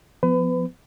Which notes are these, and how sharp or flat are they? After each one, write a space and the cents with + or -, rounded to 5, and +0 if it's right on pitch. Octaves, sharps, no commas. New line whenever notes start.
F3 +10 B3 +15 B4 +30